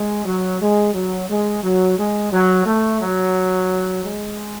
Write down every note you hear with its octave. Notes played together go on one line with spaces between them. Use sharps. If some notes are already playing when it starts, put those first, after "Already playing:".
Already playing: G#3
F#3
G#3
F#3
G#3
F#3
G#3
F#3
A3
F#3
G#3